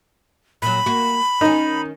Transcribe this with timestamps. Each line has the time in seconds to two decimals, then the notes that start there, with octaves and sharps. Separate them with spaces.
0.62 A#2 F#3 B5
0.86 A#3 F#4
1.41 D#3 C#4 D#4